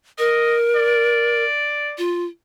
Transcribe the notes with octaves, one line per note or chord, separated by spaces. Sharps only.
A#4 D#5
D5
F4